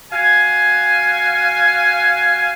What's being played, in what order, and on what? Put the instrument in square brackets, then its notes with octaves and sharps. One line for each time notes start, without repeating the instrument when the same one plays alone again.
[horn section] F#4 F5 G#5